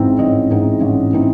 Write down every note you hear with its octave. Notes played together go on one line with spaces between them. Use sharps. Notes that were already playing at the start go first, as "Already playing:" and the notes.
Already playing: A1 G#2 E3 C4 D#4
A1 D#5
G#2 E3 C4 D#4
A1
E3 C4 D#4